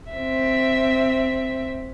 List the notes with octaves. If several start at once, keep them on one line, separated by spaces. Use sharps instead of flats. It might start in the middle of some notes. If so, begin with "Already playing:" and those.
C4 E5